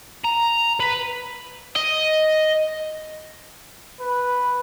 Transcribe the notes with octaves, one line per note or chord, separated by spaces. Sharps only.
A#5
B4
D#5
B4